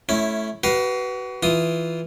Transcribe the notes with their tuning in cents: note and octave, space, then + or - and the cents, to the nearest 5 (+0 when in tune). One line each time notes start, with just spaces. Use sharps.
A3 -20 C#4 +0 E4 +0
F#4 +35 B4 -5 F5 +0
E3 +0 F4 -5 D#6 +0